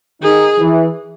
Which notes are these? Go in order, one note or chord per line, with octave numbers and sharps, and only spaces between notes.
D#3 D#4 G#4
E3